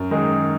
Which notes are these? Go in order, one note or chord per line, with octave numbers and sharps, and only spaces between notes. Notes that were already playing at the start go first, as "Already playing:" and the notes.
Already playing: F#2
D#3 G#3 D#4 G#4